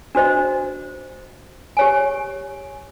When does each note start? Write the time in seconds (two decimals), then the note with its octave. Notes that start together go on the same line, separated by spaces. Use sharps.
0.15 D4 F#4 C5 D#5
1.77 G4 C#5 G#5